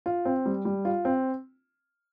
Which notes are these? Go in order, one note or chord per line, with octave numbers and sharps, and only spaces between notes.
F4
C4
G3
G3
F4
C4